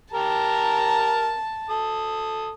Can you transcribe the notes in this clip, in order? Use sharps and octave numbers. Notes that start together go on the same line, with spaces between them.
G4 A#4 A5 A#5
A4 D#6